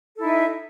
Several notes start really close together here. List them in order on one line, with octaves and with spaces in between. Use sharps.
A4 E4 D#4 E5